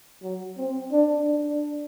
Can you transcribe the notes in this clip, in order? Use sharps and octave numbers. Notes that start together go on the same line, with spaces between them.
F#3
C4
D4
D4